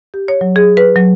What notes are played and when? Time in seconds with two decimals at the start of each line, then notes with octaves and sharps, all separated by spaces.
0.14 G4
0.28 C#5
0.41 F#3
0.56 G#4
0.77 B4
0.96 F#3